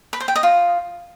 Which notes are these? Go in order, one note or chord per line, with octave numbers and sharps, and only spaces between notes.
B4
C5
G5
D#5
F4